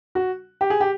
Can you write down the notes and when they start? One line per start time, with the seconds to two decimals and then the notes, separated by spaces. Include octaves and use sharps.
0.15 F#4
0.61 G4
0.70 G#4
0.80 G4